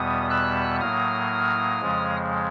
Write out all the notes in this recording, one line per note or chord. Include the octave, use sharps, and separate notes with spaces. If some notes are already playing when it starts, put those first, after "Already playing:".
Already playing: E2 B2 G3 B3 D#6
E6 F#6
A2 F#3 A#3 D#6 F6
F2 C#3 F3 G#3